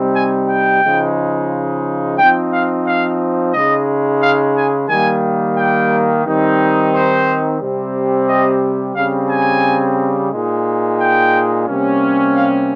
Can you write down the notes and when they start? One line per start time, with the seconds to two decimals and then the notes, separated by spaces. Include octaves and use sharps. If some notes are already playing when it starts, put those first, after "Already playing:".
Already playing: C3 G3 C4 D#4
0.15 G#5
0.49 G5
0.82 C#3 F3 G#3 D#4
2.18 F3 C4 D#4 G5
2.53 F5
2.87 F5
3.53 C#3 G#3 D#4 D#5
4.22 F5
4.56 G#5
4.89 D#3 G3 A#3 G#5
5.57 G5
6.25 D#3 G3 C4 D#4
6.93 C5
7.60 C3 G3 C4
8.28 D#5
8.95 C#3 G3 C4 F5
9.30 G#5
10.32 A#2 G#3 D#4
11.00 G5
11.66 C3 G3 A#3 C#4
12.34 F5